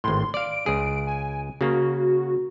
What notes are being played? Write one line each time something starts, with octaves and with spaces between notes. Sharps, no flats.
G#1 A2 C6
D5 F5 D7
C#2 G#4
G#5
C#3 A#3 F#4